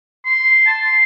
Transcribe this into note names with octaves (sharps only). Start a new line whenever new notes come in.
C6
A5
C6